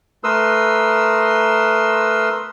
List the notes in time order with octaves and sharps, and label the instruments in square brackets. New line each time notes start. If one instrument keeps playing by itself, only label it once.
[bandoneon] A3 A#4 B4 C6 D#6 E6